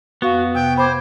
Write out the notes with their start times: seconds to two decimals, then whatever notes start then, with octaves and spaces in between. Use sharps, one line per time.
0.22 F2 B3 F#4 F5 C#6
0.55 C3 G5
0.78 C5 B5 D6 G#6